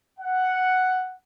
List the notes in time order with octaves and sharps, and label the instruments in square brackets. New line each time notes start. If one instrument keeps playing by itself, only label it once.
[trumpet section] F#5